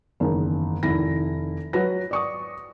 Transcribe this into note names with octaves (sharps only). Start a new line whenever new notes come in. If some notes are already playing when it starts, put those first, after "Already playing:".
F#1 E2 D#3
F1 D#3 E4 A#6
F#3 F#4 B4 A#6
D5 C#6 D#6